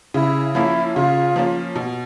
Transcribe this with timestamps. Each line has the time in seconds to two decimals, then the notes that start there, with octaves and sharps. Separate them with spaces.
0.14 C#3 E4
0.55 F3 A#3 C#4 E4
0.96 C#3 F4
1.36 F3 A#3 C#4
1.76 B2